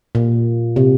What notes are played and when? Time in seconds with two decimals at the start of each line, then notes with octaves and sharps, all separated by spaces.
0.15 A#2
0.76 C3